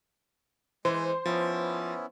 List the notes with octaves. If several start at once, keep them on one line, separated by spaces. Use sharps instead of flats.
E3 G#3 C5
F3 B3 C#4 E4